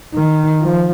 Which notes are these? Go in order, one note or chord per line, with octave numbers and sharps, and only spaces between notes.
D#3
F3